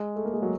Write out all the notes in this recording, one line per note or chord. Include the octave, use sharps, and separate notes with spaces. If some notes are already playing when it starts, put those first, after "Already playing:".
Already playing: G#3
A3
A#3
G#3
F#3